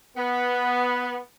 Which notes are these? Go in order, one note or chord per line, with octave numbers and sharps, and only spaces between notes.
B3